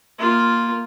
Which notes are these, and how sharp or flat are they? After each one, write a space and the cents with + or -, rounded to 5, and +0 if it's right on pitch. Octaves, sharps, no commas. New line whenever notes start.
A#3 +0 F4 +0